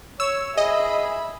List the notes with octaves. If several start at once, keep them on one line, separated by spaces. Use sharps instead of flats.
C#5 E6
G#4 D#5 E5 B5